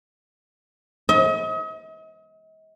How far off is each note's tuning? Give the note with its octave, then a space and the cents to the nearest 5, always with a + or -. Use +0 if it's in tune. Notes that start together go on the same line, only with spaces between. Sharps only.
D#5 +40